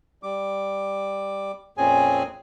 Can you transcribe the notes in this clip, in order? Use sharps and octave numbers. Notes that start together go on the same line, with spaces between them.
G3 D6
F2 A#2 C4 C#4 G#4 G#5